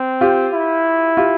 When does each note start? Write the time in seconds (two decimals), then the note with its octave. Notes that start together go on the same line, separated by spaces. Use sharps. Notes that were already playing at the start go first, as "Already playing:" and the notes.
Already playing: C4
0.21 F4 G4
0.53 E4
1.17 F4 G4